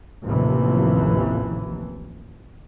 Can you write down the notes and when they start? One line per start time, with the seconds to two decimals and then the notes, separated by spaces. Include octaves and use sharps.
0.23 A1 D#2 A2 C3 E3 F3